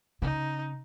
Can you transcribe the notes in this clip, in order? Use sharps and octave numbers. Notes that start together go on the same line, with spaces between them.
C#3 D#4